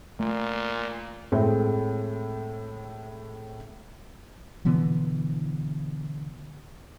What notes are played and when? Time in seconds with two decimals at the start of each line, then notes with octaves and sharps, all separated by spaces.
0.20 A#2 A3
1.32 A2 G#3 C4
4.65 B2 D3 E3 B3